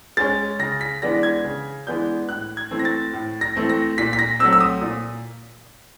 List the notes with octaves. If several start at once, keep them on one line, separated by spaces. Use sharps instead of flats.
G#3 C#4 A6
C#3 A#6
B6
E3 G#3 B3 D4 A#6
G#6
C#3
E3 G#3 B3 D4 G6
A2 F#6
G#6
E3 A3 C4
A#6
A6
A2
A#6
E3 A3 C4
A#6
A#2 B6
B6
A#6
F#3 A3 C4 E6
E6
D#6
A#2